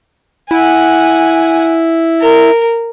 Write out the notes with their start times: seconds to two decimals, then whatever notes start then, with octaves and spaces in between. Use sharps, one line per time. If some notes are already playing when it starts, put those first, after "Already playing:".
0.51 E4 F#5 G#5
2.21 A#4